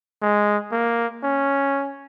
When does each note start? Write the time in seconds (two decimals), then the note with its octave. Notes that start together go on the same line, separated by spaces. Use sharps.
0.22 G#3
0.72 A#3
1.23 C#4